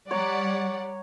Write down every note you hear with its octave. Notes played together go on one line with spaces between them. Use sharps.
G3 C#5 D5 F#5 A#5